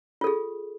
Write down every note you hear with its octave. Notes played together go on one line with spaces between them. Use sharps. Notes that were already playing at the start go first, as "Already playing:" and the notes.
F4 G#4 A4